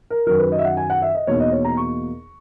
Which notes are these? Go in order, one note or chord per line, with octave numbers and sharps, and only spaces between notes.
A#4
F#2 D#3 F#3 A#4
B4
D#5
E5
F#5
G#5
F#5
E5
D#5
E2 B2 A#3 D#4 C#5
D#5
C#5
A#5
C#6